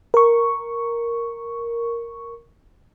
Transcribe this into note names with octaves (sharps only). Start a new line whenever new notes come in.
A#4 C#6